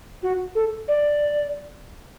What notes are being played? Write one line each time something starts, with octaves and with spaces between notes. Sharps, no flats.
F#4
A4
D5